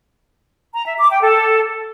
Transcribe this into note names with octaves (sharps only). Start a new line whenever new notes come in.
A#5
E5
D6
G5
A4